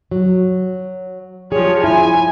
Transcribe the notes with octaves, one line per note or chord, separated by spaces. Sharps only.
F#3
F3 G3 G#4 C#5
E4 G#5